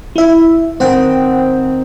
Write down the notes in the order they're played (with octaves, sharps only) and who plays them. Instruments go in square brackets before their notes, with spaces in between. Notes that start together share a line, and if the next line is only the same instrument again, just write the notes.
[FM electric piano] E4 E5
[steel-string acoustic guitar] D#3 C4 [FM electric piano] C5 F#5 G5